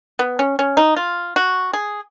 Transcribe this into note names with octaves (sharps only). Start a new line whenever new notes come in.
B3
C#4
C#4
D#4
F4
F#4
G#4